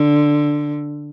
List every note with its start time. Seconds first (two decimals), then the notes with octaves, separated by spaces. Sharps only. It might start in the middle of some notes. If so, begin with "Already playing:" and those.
Already playing: D3